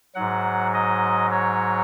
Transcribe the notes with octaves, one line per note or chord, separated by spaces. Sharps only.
G#2 F#3 F#5
D#5
C#5